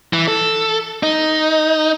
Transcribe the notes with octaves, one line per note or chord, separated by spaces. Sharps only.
E3
A4
D#4